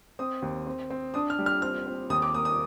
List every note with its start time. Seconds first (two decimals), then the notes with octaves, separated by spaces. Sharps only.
0.19 C4 D#6
0.42 D#2
0.67 C4
0.90 C4
1.14 D4 D#6
1.30 F6
1.39 G3
1.46 F6
1.62 C4 F6
1.87 C4
2.10 D#2 D#6
2.22 D6
2.34 A#3 D#6
2.45 D#6